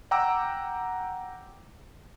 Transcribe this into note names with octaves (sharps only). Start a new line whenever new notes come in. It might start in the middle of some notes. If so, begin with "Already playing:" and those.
F#5 G5 A#5 D6 E6